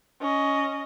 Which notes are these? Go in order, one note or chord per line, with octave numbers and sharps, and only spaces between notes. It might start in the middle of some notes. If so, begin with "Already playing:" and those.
C#4 D#5